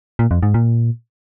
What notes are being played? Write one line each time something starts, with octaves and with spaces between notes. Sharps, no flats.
A#2
F2
G#2
A#2